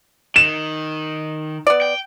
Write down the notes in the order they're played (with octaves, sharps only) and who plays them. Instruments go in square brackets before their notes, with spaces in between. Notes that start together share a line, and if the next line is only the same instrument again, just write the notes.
[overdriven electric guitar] D#3 [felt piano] E7
[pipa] B3 D5
[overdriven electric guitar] G5